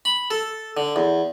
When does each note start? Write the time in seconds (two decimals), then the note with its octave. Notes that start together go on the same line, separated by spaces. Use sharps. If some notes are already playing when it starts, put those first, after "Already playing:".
0.05 B5
0.31 A4
0.77 D3
0.96 E2